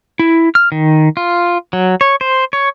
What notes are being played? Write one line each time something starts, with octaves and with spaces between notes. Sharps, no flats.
E4
F6
D#3
F4
F#3
C#5
C5
C#5